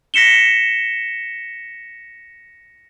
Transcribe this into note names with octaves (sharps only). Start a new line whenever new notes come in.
A#6 B6 C#7 E7 G7